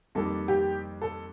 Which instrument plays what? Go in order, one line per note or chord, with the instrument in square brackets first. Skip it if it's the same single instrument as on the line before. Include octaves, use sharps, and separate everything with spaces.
[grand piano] F2 D#3 G3 A#3 D#4 [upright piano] A4
[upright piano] G4
A4